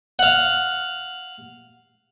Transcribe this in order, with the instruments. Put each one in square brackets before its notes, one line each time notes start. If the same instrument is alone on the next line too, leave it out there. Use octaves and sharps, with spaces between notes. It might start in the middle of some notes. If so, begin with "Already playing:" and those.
[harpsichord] F5 F#5